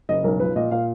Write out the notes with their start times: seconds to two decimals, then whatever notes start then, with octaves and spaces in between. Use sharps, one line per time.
0.09 F#1 D#5
0.24 B1 A#4
0.39 F3 B4
0.56 A#2 D#5
0.71 A#2 F5